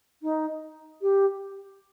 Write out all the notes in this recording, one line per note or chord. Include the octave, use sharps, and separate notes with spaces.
D#4
G4